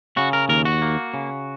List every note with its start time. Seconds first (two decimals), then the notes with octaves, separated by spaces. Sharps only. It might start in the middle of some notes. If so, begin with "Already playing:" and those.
0.17 C#3 F#4
0.33 A#4
0.49 D#2 A#4
0.65 F#4
0.82 A#3
1.14 C#3